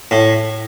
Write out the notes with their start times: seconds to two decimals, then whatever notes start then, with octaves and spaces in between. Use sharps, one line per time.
0.11 A2